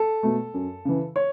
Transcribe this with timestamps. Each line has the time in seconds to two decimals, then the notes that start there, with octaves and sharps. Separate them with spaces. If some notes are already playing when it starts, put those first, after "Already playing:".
Already playing: A4
0.23 B2 A3
0.54 F#2
0.85 C#3 E3
1.16 C#5